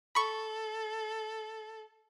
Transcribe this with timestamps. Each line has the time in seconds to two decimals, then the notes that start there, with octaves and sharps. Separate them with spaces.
0.15 A4 B5 C#6